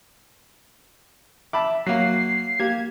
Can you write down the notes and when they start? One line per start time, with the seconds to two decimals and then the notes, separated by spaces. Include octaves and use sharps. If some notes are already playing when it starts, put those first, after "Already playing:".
1.53 E5 A5 B5 D6
1.86 F#3 A#3 C7
2.60 A#3 G4 G#6